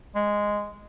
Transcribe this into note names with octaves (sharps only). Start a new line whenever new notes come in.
G#3